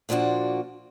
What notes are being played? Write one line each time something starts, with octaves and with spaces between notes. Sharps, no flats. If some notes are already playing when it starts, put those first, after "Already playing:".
A#2 F3 A#3 D4 F#4